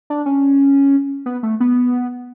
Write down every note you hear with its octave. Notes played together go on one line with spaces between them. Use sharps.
D4
C#4
B3
A3
B3